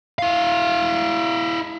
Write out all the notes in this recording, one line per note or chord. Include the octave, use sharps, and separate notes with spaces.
E4 F5